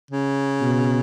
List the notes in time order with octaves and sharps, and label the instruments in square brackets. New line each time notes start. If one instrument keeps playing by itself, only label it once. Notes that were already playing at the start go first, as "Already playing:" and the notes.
[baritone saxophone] C#3
[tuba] B2